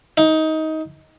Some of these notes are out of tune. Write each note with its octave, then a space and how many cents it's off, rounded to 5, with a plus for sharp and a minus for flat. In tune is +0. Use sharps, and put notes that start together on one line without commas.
D#4 +20